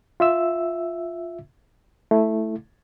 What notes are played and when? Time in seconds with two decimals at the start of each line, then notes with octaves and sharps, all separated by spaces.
0.20 F4 E5 E6
2.11 A3 E4